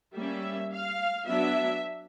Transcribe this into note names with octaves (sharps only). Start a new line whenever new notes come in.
G3 A#3 C#4 E5
F5
F#3 B3 D4 E5